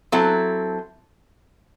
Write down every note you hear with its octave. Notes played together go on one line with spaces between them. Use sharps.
F#3 C4 E4 A4